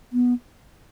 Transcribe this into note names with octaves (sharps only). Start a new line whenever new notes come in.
B3